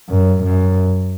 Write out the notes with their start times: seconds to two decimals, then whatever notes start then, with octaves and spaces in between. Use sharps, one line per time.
0.09 F#2
0.44 F#2